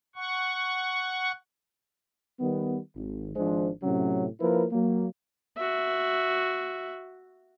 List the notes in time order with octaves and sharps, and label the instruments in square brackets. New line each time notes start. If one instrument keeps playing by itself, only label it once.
[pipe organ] F#5 C#6
[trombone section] D#3 G3 B3
G#1
G#1 F3 G#3 D4 C5
A2 C3 F#3 C#4
F3 A#3 E4 A#4 B4
F#3 A#3
[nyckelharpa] F#4 E5